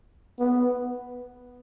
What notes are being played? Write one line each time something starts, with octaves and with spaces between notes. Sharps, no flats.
B3